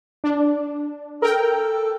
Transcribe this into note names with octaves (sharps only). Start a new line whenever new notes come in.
D4
A4 A#4 G5